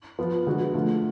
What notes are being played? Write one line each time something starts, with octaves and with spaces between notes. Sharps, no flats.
F3 B3 F4
D3 G#3 B3 F#4
D3 F3 A3 F4